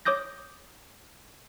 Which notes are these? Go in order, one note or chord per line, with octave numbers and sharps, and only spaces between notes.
C#5 D6 D#6 G6 A#6